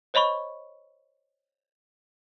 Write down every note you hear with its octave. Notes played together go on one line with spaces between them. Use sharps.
C5 C#5 D#5 B5 C#6